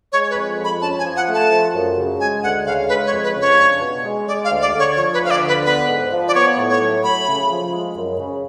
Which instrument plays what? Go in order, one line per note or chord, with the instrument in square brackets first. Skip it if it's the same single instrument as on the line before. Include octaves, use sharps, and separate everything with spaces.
[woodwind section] G#3 [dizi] C#5
[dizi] B4
[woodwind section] F2
F3
[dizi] B5
[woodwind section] C#4 [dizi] A5
[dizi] G#5
[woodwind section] F3
[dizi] F#5
[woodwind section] A3
[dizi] A5
[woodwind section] F3
F#2
C#3
[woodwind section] G#3 [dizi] G#5
[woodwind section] D2 [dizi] F#5
[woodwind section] C#3 [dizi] F5
[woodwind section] G#3 [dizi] B4
[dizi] C#5
[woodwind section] F2
[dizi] B4
[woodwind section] C#3
[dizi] C#5
[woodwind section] D4
B2
G#3
[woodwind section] G#3 [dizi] D5
[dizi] F5
[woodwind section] D2
[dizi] D5
[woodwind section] D3
[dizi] C#5
[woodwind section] F3 [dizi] C#5
[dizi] B4
[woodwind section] D2
[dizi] F5
D5
[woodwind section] D3
[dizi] B4
[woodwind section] B3 [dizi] B4
[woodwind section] G#2
F3
[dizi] D5
[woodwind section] B3 [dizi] C#5
[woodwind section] A2
[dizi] C#5
[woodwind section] F#3
[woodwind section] A3 [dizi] B5
[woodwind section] C#3
F3
G#3
F#2
C#3